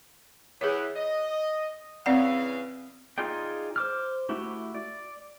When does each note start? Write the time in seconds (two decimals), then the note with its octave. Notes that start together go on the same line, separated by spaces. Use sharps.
0.61 E3 B3 G#4 C#5
0.95 D#5
2.06 C#3 E3 C4 D5 F5 F#5
3.18 D#4 F4 G#4 D5 G5
3.76 C5 D6 F6
4.29 A3 E4 F#4 G4
4.75 D5